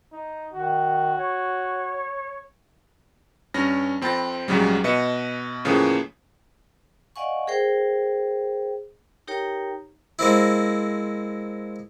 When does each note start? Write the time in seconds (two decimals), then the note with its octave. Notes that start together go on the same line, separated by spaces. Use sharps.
0.13 D#4
0.53 D#3 F#4
1.17 C#5
3.54 G2 C#4 F6 A#6
4.01 F2 C4 G5 B5 A6 A#6
4.48 A#1 G#2 C#3 F#3 G3
4.84 B2 B4 D#5 E5 C#7
5.65 A2 C#3 E3 F3 A#3
7.16 D5 D#5 F5 F#5 G#5 C#6
7.47 G#4 A#4 C5 G5
9.27 D#4 G4 A#4 C#5 G5 A#5
10.19 G#3 A#3 C4 E4